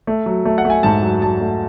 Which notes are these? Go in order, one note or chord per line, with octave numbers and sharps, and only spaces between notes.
A3
F#3
A3
F#5
A3
G#5
G#2 A5
F#3
F#3 A5
A3